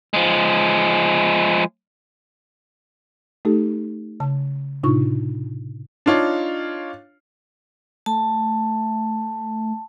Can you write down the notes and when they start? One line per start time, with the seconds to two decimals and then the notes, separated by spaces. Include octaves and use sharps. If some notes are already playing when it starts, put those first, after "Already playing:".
0.14 F3 G#3
3.45 A3 D#4 G4 A4
4.20 C#3 A5
4.83 A2 C3 D4 D#4 F4 C#6
6.06 D4 D#4 F4 C#5 F5
8.06 A3 A5